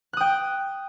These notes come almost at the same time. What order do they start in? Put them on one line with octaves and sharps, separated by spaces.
F#6 D#6 G5